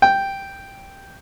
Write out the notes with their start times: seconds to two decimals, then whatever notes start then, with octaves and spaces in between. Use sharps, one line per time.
0.02 G5